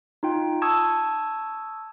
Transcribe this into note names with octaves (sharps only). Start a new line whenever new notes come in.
D#4 F4 G5
A5 C#6 D#6 E6 G#6